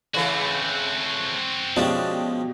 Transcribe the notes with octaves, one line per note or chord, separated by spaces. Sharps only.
C#3 E3 A3 C4 F#4
B2 F3 G#3 C#4 D4 G4